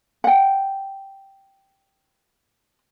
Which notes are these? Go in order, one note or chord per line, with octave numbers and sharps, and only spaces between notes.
F#5 G5